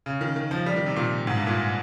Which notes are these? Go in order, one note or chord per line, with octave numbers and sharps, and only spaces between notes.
C#3
D#3
D#3
F3
G3
D#3
C3
A#2
G#2
G2
A#2